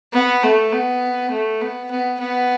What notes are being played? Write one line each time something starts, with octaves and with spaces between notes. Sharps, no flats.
B3
A3
B3
A3
B3
B3
B3